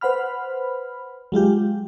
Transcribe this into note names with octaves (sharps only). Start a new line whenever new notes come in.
B4 C5 F#5 B5 F6
F#3 G#3 F4 G4